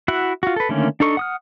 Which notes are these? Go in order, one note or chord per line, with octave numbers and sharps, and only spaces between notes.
E4 F#4 E5 F#5
F4 F#4
A4 B4
D3 D#3 A3 A#3 C#4
D4 D#4 A4 C#6
F#5 D#6 F6